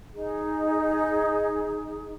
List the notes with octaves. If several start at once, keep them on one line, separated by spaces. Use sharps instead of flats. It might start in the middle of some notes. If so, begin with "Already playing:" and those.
D#4 G#4